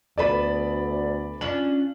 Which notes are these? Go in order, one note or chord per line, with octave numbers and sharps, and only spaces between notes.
D2 B3 A4 B4 D5 B5
C#4 D4 F4 F#7